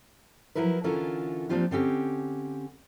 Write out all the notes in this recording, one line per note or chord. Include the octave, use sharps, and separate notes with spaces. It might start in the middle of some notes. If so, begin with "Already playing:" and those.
F3 F#3 E4 A#4 B4
D3 E3 C#4 F4 A4 A#4
F3 A#3 C4 D4 F4 G4
D3 C4 C#4 G4